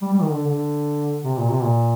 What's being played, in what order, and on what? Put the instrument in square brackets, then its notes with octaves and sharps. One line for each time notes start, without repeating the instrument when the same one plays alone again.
[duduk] G3
G3
D#3
D3
D3
C3
A#2
C3
A#2